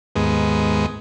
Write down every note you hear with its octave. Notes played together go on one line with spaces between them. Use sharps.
D#2 G#2 G#3 B3